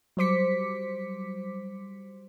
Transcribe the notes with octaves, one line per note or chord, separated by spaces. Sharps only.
F#3 G3 C5 D6 B6 C#7